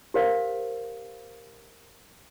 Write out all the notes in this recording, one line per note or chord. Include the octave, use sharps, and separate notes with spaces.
G4 A#4 C5 F5